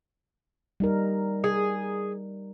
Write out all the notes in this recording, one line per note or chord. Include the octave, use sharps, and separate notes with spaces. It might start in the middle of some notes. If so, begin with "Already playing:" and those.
G3 D#4 A#4
G#4